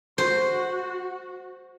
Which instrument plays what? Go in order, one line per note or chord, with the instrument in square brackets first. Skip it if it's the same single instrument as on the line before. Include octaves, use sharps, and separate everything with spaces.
[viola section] F#4 [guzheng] C5